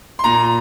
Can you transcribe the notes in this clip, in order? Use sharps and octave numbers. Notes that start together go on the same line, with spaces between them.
C6
A#2 A#5